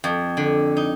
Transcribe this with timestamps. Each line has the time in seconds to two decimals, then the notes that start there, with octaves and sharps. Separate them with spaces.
0.04 F2
0.37 D3
0.77 D#4